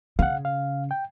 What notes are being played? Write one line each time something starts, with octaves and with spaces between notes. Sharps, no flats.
C#3 F5 F#5
F5
G5